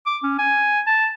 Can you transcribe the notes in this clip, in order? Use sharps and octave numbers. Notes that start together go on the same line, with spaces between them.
D6
C#4
G#5
A5